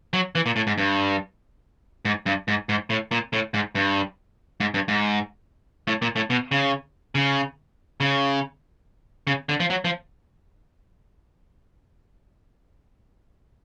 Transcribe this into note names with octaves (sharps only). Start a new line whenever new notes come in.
F#3
E3
A#2
A2
G#2
G2
G#2
G2
G#2
G#2
A2
A#2
A2
G#2
G2
G#2
G2
G#2
A2
A#2
A2
B2
C#3
C#3
C#3
C#3
D3
F3
F#3
F3